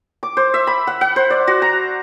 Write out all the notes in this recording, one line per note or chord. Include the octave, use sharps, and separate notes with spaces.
D6
C5
E5
B5
F#5
F#5
C5
D5
F#4
A#5